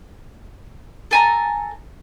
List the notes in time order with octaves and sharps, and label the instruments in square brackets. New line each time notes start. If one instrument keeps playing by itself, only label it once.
[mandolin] A4 G#5 A#5